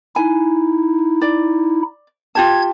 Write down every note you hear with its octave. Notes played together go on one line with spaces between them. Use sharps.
D#4 E4 G#5
D5
F4 G4 A5 G#6